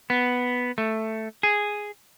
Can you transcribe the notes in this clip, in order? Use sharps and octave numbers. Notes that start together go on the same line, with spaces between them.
B3
A3
G#4